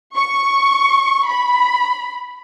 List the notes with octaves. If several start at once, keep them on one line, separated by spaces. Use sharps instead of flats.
C#6
B5